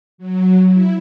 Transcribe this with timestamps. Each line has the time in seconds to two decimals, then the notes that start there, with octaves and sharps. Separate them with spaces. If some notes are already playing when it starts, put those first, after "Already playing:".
0.18 F#3
0.65 E4